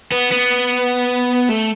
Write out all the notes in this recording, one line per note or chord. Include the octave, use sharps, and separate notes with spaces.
B3
B3
A3